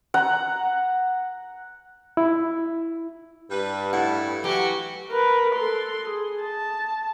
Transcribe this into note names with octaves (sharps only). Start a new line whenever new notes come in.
F#5 A#5
E4
G2 G3 B4
A2 E4 F#5
E3 F#3 F#4 G4
A#4 B4
A4 C6
G#4
A5